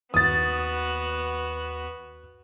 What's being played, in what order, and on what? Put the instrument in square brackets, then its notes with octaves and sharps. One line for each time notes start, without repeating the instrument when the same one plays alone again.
[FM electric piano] D#2 [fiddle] B3 F#4 [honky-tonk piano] D#6 A6